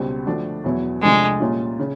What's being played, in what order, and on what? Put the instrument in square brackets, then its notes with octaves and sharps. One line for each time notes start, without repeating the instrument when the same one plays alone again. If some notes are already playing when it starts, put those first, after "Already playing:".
Already playing: [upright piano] C#2 B2 G3 C4
D3 F3 A3 D4 F#4
E2 B2 F#3 B3 E4
[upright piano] C2 C3 F3 A3 D4 [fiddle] G#3
[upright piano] A#2 G3 A#3 C#4 F4
C#3